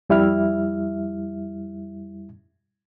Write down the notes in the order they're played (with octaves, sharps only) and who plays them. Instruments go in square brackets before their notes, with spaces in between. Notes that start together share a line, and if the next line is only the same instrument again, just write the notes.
[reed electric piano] F2 G3 E4 E5 F6